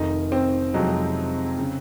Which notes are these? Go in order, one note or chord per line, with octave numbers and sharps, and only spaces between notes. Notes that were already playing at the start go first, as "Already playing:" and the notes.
Already playing: F1 F2 D#3 D#4
C4
F2 C3 F3 F#3 G#3 D#4
C#3